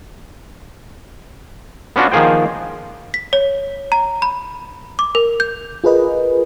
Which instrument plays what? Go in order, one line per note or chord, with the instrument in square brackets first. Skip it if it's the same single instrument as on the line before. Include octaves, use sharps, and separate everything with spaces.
[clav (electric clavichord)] B3 C#4 D4 F4 F#4
D#3 F3 A#3 G#4 C5 G5
[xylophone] B6
C#5
A#5
B5
D6
A#4
G6
[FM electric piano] F4 G#4 A#4 B4 D#5